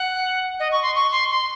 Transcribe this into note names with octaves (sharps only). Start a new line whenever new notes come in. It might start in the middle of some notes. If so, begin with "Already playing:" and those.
Already playing: F#5
D#5
C#6
C6
C#6
C6
C6